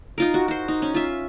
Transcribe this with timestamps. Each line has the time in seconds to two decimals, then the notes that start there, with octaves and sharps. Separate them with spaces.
0.18 D#4 F4 A#4
0.34 F#4
0.48 F#4 C5
0.68 D#4
0.82 C#4
0.94 F4 E5